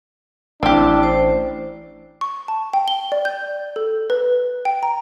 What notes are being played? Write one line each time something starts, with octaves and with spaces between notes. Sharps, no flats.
A1 C4 D4 E4 G4
C5
C#6
A5
G5
G7
D5
G6
A4
B4
G5
A#5